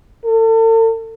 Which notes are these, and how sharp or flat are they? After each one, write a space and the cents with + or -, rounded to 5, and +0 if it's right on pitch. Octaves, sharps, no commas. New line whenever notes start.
A4 +40